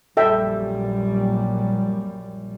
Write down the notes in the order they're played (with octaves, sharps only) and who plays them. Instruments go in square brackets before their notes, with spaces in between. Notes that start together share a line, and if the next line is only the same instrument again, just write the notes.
[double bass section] A#1 F#2 G3 [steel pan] A4 E5 G5